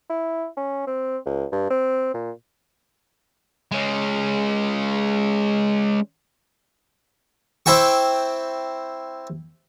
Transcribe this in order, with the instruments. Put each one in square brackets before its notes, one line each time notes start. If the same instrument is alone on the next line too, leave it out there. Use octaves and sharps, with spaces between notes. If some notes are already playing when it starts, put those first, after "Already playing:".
[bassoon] E4
C#4
C4
C#2
G2
C4
A#2
[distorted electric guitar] G#3 C#4
[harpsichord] C4 E4 G5 C#6